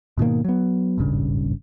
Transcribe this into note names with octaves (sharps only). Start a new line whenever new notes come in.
G#2 B2 D#3 A#3
F#3 B3
D#1 G#1 G2 C#3